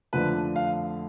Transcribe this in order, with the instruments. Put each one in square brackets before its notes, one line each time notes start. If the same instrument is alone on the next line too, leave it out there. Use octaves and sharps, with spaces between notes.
[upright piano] F2 D3 F3 A3 D4 [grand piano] B4
[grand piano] F5